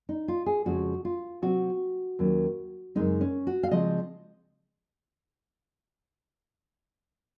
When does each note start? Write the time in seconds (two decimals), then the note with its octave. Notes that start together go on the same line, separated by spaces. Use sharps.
0.09 D#4
0.28 F4
0.46 G#4
0.65 F2 C#3 F3 G#3 C#4 F#4
1.05 F4
1.42 C3 F#3 C4 F#4
2.19 D#2 D#3 F#3 C#4
2.95 F#2 C#3 F3 G#3 C4 D#4
3.21 C#4
3.47 F#4
3.63 F5
3.71 C#3 F3 G#3 C4 D#5